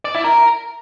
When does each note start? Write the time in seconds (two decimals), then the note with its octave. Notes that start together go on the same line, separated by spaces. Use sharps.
0.05 D5
0.15 E4
0.24 A#4